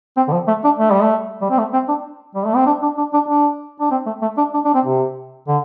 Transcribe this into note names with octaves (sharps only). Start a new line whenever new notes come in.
C4
D3
F3
A3
D4
A3
G3
A3
G3
C4
A3
C4
D4
G3
A3
C4
D4
D4
D4
D4
D4
D4
C4
A3
A3
D4
D4
D4
C4
C3
D3